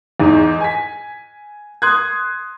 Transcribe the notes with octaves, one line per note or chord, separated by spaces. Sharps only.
E2 G#2
G#5 B6
C6 D#6 F#6 G#6